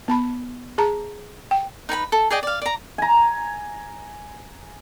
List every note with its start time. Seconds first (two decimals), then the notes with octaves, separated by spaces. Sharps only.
0.08 B3 A5 B5
0.78 G#4 A5 A#5
1.51 G5
1.89 D#4 B4 G#5 B5
2.12 A4
2.30 G#4 D5 D#5 G5
2.43 D5 F5
2.62 D5 A#5
2.98 G#5 A#5